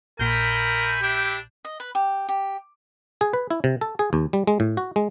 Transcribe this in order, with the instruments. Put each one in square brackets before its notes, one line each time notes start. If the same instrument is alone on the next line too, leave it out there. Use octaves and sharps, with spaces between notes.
[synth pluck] A#1 A#2 [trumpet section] A3 G#5 B5 [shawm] A#4 [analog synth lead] G6
[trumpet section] D4 E4 E5 [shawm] G4
[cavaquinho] D#5
B4
G4
G4
[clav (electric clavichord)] G#4
B4
E4
C3
A4
G#4
D#2
G3
G#3
A2
F#4
G#3